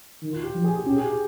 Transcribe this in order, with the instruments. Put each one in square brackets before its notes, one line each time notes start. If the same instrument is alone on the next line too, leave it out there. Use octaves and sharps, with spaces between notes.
[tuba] D#3
[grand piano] F4
G4
[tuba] F3
[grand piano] G#4
G#4
[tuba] C#4 [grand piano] G4
[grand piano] G#4
G4